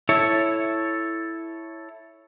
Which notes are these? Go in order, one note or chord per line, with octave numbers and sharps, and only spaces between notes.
E4 A4 C#5